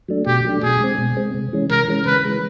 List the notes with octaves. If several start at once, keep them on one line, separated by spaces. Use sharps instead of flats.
F#3 A3 D4
B2 G4
F#3 A3 D4
B2 G#4
G#3 C4
B2
G#3 C4
C3
E3 G#3 C#4
C3 A#4
E3 G#3 C#4
C#3 B4
E3 G#3